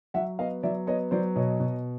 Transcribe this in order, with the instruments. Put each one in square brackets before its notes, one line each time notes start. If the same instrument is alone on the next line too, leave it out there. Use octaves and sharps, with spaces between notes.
[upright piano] F#3 E5 F#5
B3 D#5 F5
F#3 D5 E5
B3 C#5 D#5
F#3 C5 D5
B2 C#5 D#5
B2